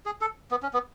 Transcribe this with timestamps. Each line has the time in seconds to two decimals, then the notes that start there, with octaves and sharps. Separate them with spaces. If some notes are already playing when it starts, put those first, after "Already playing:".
0.06 G#4
0.21 A4
0.51 B3
0.63 C#4
0.73 B3